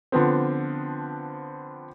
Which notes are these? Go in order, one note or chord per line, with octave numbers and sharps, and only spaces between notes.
D3 F3 B3 C4